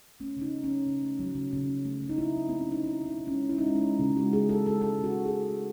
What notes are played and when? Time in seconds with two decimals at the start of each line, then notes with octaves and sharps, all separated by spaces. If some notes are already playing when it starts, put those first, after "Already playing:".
0.20 A3 C#4
0.37 C#3 D#4
0.53 A3
0.64 C#4
0.70 F#3
0.86 C#3
1.02 A3
1.19 F#3
1.35 C#3
1.53 C#3
1.69 C#3
1.85 A3
2.02 C#3
2.09 D#4
2.18 C#3 E4
2.35 F#3
2.49 A3 C4
2.61 C#4
2.67 A3 D#4
2.83 C#3 E4
3.01 C#3 D#4
3.18 C#3
3.27 C#4
3.33 G#3
3.49 G#3 E4
3.58 D#4
3.66 G#3 C#4
3.75 D#4
3.83 G#3
3.99 C#3
4.16 G#3 F#4
4.33 G#3 G#4
4.49 G#3 A4
4.66 G#3 A4
4.82 G#3 A4
4.99 C#3
5.04 F#4
5.15 C#3
5.26 G#4
5.31 C#3
5.48 A3